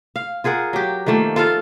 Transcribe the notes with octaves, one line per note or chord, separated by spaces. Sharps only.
F5
F4 G#4 A#4 F#5
F#3 G4
D#3 F3 A3 A#3
F4 A4 F5